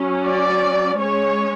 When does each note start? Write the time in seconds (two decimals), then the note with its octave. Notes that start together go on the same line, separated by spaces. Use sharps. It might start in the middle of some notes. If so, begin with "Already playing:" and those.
Already playing: F#3 C#4
0.24 D5
0.99 G#3 C#4 C#5